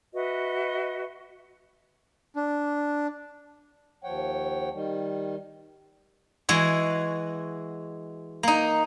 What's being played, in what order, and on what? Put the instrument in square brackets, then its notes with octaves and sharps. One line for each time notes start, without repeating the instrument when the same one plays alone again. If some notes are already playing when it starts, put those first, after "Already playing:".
[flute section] F#4 B4 D#5 E5
[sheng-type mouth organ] D4
[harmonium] D#2 F3 C#5 F#5 G5
D#3 G3
[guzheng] E3 G#3 F#4
A#3 D#4